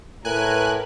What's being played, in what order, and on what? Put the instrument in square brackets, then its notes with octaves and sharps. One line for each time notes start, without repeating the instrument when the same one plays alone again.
[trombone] A2 [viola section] A#4 B4 [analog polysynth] G#5 F#6